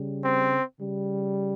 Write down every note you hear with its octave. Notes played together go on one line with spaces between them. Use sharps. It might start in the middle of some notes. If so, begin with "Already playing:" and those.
Already playing: C#3 G3
C4
C#3 G3